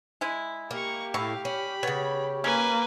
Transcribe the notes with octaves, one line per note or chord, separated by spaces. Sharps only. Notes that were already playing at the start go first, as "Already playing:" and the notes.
G#3 E4
A#3 G4 A#5 C#6
A2 E4 F5 C#6
C#4 B5
C#3 B3 C#5
A#3 C#4 B4 G#5